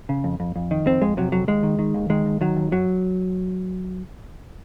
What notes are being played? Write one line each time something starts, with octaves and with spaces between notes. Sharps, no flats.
C#3
F2
F2
F2
D#3
F2 C4
F2 G#3
C3 F#3
F2 F#3
D#2 G#3
D#3
D#3
D#2
D#3 G#3
D#2
D#3 F#3
D#2
F#2 F#3